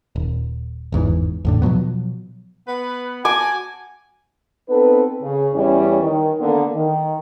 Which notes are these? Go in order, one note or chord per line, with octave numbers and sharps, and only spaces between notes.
D#1
G1 E2 G#2 E3
E2 A2 D3
B2 F3 F#3 B3
B3 B4
F#4 G#5 D6
B3 C4 D#4 A4 B4
C#3
E2 E3 G3 C#4
D#3
D3 A#3 B3
D#3